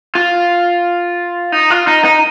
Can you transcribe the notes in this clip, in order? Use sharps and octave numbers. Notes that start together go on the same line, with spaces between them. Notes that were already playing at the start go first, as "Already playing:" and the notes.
F4
D#4
F4
D#4
D#4